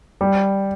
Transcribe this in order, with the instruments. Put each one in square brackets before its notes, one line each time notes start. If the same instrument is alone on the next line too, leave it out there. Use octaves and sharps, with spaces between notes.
[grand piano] G3